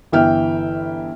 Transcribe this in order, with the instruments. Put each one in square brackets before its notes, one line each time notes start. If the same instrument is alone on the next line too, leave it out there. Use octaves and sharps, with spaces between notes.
[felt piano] G1 E3 E5 G5 F6